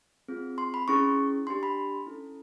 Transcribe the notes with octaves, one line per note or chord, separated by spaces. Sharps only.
C4 F4 G#4
C6
B5
C#4 E4 G#4 C#6
D4 G4 C6
B5
C#4 E4 A4